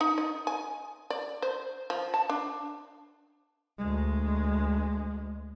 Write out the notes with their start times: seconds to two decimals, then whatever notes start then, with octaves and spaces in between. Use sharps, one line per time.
0.01 D#4
0.18 D#5
0.47 G#5
1.10 D5
1.42 C5
1.90 F3
2.14 A5
2.30 D4
3.78 D2 G#3